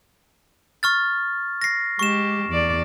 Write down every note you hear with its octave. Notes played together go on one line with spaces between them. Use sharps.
C#6 F6 A6
A#6 C7
G#3 G4 C#6 E7
E2 D5